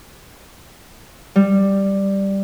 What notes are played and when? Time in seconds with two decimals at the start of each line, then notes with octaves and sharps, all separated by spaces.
1.36 G3